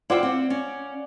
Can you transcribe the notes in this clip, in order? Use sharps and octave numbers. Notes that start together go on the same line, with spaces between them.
E4 F4 C5 D5 F#5 G5
C4 F#5
C#4